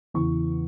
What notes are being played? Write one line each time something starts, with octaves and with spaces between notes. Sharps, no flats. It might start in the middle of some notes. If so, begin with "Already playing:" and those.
E2 C#3 E3 C#6